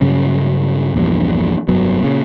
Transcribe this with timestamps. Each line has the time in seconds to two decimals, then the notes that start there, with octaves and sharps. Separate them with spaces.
0.01 G2 C#3 F#3 C#4
0.94 A#1 E2 G2
1.68 F1 G2 F#3 B3
2.01 A#2 C#3